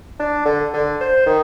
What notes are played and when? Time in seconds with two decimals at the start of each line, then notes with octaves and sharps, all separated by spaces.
0.20 D4
0.45 D3
0.74 D3
1.01 C5
1.26 D#3